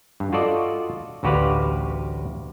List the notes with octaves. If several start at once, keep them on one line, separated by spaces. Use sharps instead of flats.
G2
F4 F#4 A4 D5 D#5
A1 D2 F#4 G4 B4 F5